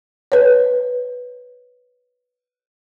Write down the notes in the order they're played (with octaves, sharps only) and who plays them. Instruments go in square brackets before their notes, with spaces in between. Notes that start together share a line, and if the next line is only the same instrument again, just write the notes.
[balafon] B4 C#5